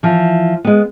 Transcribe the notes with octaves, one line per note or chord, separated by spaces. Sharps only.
E3 F3
G#3 B3